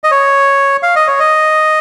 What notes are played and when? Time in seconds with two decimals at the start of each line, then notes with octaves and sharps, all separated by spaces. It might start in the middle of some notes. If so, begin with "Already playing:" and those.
0.04 D#5
0.11 C#5
0.83 F5
0.96 D#5
1.08 C#5
1.19 D#5